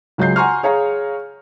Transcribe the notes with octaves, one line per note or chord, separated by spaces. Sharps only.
C#2 F#3 G#3 G6 C7
F#5 G#5 A#5 C6 C#6 F6
G#4 C#5 F5 A#5